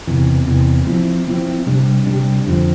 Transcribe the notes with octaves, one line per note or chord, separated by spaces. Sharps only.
E2 C3 E3
E2 C3 E3
F3 C4 E4
F3 C4 E4
C3 G3 D4 G4
C3 G3 D4 G4
F2 D3 F3 C4